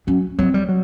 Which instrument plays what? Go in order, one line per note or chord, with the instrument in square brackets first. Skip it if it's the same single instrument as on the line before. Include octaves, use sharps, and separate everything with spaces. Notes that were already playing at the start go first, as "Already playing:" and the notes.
[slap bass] F#3 [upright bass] C#4
[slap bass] F#3 [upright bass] C4
[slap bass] G3
F#3